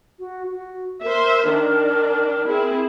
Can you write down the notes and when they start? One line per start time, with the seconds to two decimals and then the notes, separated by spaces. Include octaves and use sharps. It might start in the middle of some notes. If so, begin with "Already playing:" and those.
0.19 F#4
0.51 F#4
1.03 A#4 C5 E5
1.48 D#3 D4
2.47 C4 E4 G#4